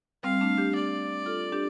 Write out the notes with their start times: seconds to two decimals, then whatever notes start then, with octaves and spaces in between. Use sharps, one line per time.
0.23 G3 C4 F5
0.41 A3 D4
0.58 D4 G4
0.75 D5
1.26 F4 A4
1.52 D4 G4